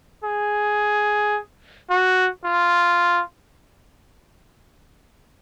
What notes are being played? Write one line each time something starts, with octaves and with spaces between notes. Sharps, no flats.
G#4
F#4
F4